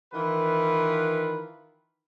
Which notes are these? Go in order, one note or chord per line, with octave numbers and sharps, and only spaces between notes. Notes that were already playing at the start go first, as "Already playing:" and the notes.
D#3 E3 F4 B4